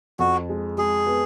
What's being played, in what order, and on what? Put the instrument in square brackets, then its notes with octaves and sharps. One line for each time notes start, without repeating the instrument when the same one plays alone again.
[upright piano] F2 [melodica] F#4
[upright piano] G#3
[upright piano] G#3 [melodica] G#4
[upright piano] B3